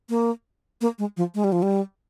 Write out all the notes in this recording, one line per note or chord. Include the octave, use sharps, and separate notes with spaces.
A#3
A#3
G#3
F3
G#3
G3
F3
G3